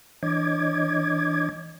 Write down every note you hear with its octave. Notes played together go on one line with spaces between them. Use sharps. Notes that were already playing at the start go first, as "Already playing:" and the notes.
E3 D4 C#5 D#5 D6 G#6